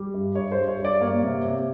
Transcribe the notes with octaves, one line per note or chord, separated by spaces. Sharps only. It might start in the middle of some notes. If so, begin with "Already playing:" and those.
Already playing: G3
G2
G2 C#5
C5
G2
C#5
G2
D5
A#3 C#5
C3
C3